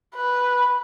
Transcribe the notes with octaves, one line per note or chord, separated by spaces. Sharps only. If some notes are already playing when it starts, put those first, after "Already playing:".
B4